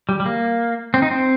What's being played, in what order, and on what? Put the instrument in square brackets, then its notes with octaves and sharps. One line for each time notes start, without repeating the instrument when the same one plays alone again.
[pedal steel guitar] G3
G3
A#3
C4
D#4
C4